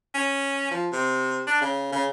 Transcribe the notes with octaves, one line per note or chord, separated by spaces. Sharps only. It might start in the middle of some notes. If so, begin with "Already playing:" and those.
C#4
F3
C3
D4
C#3
C#3